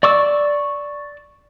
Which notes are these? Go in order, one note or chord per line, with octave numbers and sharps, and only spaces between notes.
D5 C#6 D6 E6